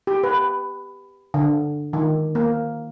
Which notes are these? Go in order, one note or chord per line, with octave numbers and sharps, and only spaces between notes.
G4
B4
D3
D#3
A#3